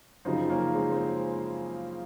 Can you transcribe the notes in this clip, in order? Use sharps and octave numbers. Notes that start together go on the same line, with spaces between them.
F#2 C#3 F3 C4 D#4
A#3 C#4
G#3 C4
C4